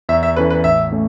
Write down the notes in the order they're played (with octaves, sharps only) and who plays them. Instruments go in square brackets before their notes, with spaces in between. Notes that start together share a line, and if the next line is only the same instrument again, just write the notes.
[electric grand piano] E2 [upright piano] E5
[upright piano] E5
[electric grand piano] E3 C#4 A4 [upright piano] B4
[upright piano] B4
[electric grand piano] A1 [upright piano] E5
[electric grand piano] A3 C#4